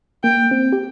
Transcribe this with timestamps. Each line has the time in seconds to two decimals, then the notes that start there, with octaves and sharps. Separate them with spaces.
0.24 A#3 G5
0.51 C4
0.72 G4